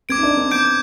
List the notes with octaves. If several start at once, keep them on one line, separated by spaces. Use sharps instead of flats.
C4 D6 G#6 D7
D#4
D4
C4
B3 D6 G6 D7